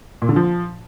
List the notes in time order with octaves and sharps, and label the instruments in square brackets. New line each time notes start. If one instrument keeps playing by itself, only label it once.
[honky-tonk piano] A#2
D3
F3